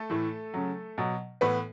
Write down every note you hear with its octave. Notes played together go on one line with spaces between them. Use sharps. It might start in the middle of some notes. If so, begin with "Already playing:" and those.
Already playing: A3 A4
A2 E3
C#3 F#3
B2 F#3
A2 E3 B3 B4